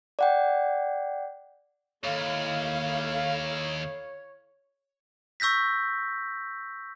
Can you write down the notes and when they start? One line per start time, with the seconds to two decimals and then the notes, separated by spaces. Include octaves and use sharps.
0.19 D5 F#5 G5
2.04 D#2 E4 A4 C#5 F5
5.40 C#6 E6 G6 A#6 B6